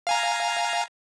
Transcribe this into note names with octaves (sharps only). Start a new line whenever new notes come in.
F5 G#5 A#5